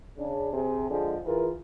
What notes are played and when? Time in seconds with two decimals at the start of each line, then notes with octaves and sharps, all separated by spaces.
0.18 C#3 D4
0.53 C3 G#4
0.91 D3 F3 G#3
1.25 E3 F4 G#4 A#4